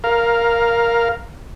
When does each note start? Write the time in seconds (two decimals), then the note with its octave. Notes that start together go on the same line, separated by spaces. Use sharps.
0.04 A#4 F5